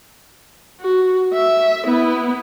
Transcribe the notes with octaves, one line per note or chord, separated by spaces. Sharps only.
F#4
E5
B3 E4